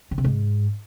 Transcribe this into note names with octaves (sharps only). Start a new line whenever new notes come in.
C#3
C3
G#2